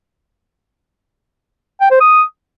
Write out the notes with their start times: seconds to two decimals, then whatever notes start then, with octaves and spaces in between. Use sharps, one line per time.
1.81 G5
1.90 C5
2.00 D#6